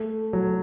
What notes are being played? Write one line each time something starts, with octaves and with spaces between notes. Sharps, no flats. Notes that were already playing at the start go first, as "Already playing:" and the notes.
Already playing: A3
F#3